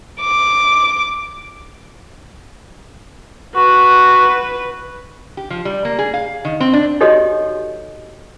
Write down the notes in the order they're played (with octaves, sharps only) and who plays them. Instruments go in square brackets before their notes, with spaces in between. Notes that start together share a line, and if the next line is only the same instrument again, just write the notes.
[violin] D6
[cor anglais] F#4 [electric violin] B4
[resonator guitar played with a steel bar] G4
F3
G3
A#3
G#4
F5
D#3
C4
D4
[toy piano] D#4 F#4 G4 A4 C#5 D#5